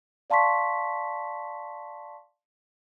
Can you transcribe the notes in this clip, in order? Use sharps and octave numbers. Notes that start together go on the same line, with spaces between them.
D5 F5 A5 C6 C#6 B6